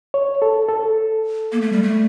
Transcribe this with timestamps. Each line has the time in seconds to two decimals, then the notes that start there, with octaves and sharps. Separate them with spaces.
0.14 C#5
0.42 A4
0.68 A4
1.52 A#3
1.62 A3
1.72 G3
1.83 A3